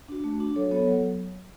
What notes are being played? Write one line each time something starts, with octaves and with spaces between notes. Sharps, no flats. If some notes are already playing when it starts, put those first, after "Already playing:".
D4 F#4
A3
D4 F#4
F#3 A4 C#5
B3 F#4 A4 C#5
F#3